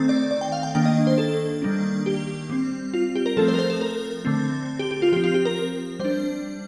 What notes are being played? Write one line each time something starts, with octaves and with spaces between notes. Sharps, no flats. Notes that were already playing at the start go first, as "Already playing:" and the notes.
Already playing: D#3 A3 C4
D5
D5
G5
F5
G5
D#3 A#3 D4 G5
D#5
C5
A4
D#3 G3 A#3 D4
G4
G3 C4
F4
G4
A#4
F3 A3 C4 A4
C5
A#4
C5
A4
A#4
D3 A3 C4
G4
G4
F4
F3 C4 G4
F4
G4
A#4
G3 D4 C5